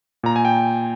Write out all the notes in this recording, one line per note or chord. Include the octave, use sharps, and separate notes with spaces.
A#2 A#5
G#5
G5